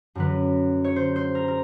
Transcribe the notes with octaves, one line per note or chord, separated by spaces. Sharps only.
F#2 D3 F#3 B4
C#5
C5
C5
A#4
A#4